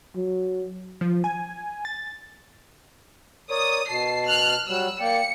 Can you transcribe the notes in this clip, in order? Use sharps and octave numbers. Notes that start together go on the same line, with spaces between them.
F#3
F3
G#5
A6
A#4 C#5 D5 D#6
B2 A5 C7
F6 F#6
F#3 G3 E6 F#6
A#3 D5 G5 C#7